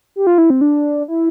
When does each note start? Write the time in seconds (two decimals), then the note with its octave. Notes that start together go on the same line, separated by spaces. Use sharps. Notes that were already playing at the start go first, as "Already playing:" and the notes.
0.16 G4
0.27 F4
0.38 E4
0.50 C4
0.61 D4
1.08 E4